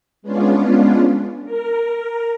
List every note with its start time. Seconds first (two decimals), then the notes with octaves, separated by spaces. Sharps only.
0.22 G#3 B3 C#4 D4 F4
1.45 A#4